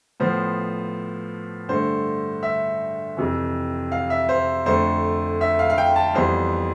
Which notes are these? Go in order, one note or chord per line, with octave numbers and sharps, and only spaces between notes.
A2 F3 B3 C5
G2 D3 A3 C5
E5
F2 C3 E3
F5
E5
C5
F2 D3 A3 C5
E5
F5
F5
G5
A5
F2 E3 G3 B3 C5